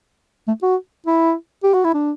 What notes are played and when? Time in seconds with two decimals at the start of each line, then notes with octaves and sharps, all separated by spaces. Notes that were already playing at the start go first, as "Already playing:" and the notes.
0.48 A3
0.63 F#4
1.07 E4
1.63 G4
1.74 F#4
1.85 E4
1.94 D4